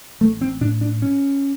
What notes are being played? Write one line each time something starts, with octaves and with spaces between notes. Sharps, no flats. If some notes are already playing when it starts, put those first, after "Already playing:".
A1 A3
C4
A2 D4
D4
C#4